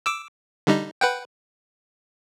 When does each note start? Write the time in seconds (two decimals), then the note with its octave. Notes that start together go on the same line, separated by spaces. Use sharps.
0.06 D6 E6
0.67 D3 G3 D#4
1.01 B4 F#5 G5